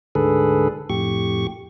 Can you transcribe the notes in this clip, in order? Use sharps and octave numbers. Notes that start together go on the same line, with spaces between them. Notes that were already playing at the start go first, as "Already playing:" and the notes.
D2 G#2 D3 G#4 A4 B4
F2 A2 G4 C#6